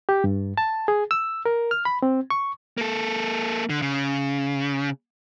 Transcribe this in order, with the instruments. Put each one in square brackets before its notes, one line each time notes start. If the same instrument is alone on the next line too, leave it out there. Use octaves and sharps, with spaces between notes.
[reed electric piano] G4
G2
A5
G#4
E6
A#4
F6
B5
C4
C#6
[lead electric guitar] A#3 A4
D3
C#3